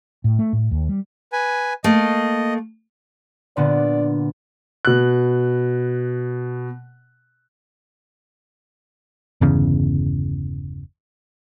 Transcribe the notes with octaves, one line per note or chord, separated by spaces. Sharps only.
A2
A3
A2
D#2
G3
B4 G#5
A3 A#3 D#5
A#2 D3 B3 D5
B2 F#6
G1 E2 C#3